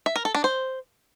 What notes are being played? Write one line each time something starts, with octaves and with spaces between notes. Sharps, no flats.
E5
A#4
A4
D4
C5